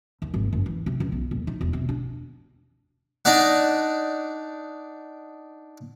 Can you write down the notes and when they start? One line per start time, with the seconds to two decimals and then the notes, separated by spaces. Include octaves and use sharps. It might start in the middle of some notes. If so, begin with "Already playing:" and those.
0.22 D#2
0.34 G#1
0.53 F#1
0.66 E3
0.86 C3
1.00 C#2
1.12 B1
1.31 D#1
1.47 D#4
1.61 E1
1.73 C3
1.89 D4
3.25 D4 D#4 D5 F#5